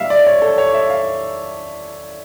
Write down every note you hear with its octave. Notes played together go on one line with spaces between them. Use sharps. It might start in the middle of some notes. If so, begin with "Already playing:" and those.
Already playing: A#2 G3 E5 F5
D5
C#5
A4
C#5
E5
F5